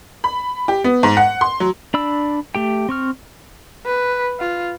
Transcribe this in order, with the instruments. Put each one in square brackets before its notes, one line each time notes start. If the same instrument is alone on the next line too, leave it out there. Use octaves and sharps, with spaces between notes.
[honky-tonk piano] B5
G4
B3
G#2
F#5
C6
F#3
[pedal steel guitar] D4 D5 B5 E6
A3 G4 G5
C4 C#6 F6
[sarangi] B4
F4